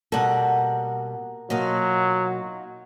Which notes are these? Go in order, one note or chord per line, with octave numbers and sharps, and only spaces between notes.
B2 G3 A#3 A4 F#5
B2 F#3 A#3 D#4 F4 F#4